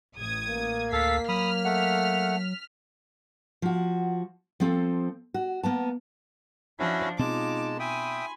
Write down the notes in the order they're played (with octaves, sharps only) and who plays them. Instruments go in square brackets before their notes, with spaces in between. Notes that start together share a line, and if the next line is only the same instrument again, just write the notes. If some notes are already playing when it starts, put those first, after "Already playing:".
[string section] A1 D#6 G#6
[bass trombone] A#3
[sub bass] D2 [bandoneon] A4 F5 [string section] B6 C7
[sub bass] F#3 [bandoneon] B5 D#6 [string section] F6 B6
[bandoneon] A3 F#5
[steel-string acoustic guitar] F3 F#4
F3 C4 A4
F#4
A#3 B3 A5
[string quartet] F3 D4 [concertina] C#4 E4 F#4
[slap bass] B2 C4 [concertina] G#3 A5 [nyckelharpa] D#4 F4 [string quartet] D6
[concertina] E5 G5 D#6 [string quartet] G#5 [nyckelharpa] B5 C6